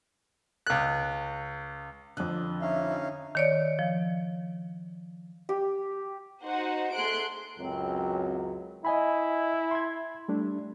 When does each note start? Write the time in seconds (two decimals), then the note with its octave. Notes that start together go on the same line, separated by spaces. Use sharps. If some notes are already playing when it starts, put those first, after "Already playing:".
0.67 C#2 F#6
2.17 F2 D3 F#6
2.62 C#4 D#4 E5 F5
3.35 D#3 C#5 D5
3.79 F3
5.49 G4
6.44 D#4 F#4 C5 F#5
6.94 A3 G#4 C6 F#6 D7
7.57 C#2 F#2 F#3 C4
8.85 E4 D#5 G#5 B5
9.71 C6 G#6
10.28 G3 A3 D4